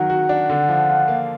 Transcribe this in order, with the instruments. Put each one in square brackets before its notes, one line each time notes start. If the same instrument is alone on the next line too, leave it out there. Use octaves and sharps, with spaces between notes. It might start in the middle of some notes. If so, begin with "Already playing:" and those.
Already playing: [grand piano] D#3 F#3 [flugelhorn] F#5
[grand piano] F#4
D4
D3
F3
F4
A#3